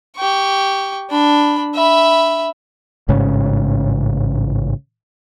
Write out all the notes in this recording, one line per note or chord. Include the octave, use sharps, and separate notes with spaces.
G4 C#6
D4 B5
E5 B5
A1 G#2 C#3 C#4